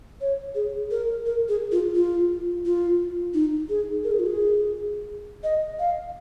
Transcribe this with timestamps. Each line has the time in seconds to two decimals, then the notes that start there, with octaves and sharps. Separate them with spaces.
0.21 C#5
0.55 G#4
0.91 A#4
1.26 A#4
1.49 G#4
1.72 F4
1.95 F4
2.65 F4
3.34 D#4
3.69 G#4
4.04 A#4
4.11 G#4
4.19 F4
4.27 G#4
5.43 D#5
5.79 F5